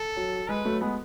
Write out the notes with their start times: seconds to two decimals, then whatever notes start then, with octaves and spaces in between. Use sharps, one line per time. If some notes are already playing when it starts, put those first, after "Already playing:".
Already playing: A4
0.16 F#3
0.48 G#3 B4
0.65 F#3 A3
0.81 G#3 B3